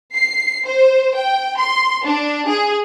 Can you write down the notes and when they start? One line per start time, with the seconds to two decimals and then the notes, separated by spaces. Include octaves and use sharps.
0.15 C7
0.66 C5
1.15 G5
1.59 C6
2.06 D4
2.48 G#4